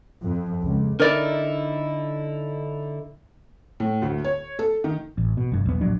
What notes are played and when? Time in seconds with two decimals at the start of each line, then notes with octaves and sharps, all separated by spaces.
0.22 F2
0.63 C#2
1.00 D3 D#4 E4 A#4 D5
3.80 A2
4.02 D2
4.24 C#5
4.59 A4
4.84 D#3
5.18 A1
5.37 B2
5.52 F1 G2
5.66 B1 E2 B3
5.81 D1 A#1 F#3 D4